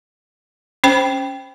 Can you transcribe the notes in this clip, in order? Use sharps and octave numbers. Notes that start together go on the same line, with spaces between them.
C#4 C5 G5 B5